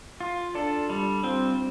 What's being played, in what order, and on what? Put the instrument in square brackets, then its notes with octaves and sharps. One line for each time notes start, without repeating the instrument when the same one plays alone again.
[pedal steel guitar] F4
[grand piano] D4 D5 [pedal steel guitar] A4
[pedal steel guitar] G3 [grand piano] D4 D5
[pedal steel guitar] C4 [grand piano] F4 F5